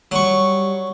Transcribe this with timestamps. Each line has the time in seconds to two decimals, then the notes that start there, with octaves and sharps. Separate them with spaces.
0.11 F#3 G3 C#6